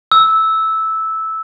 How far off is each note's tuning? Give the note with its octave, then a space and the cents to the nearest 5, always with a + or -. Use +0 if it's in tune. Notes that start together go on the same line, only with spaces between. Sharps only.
E6 -10